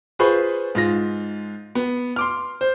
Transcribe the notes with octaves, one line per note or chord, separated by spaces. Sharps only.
F4 G#4 B4 C5 B5 C#6
G#2 F4 A#6
B3
C6 D6 F6
C5